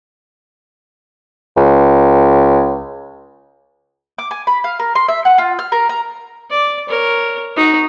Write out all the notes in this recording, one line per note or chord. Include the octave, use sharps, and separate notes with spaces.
C#2
D6
G#5
B5
F5
A#4
C6
E5
F#5
F4
F6
A#4
A#5
D5
A#4 C#5
D#4 F#4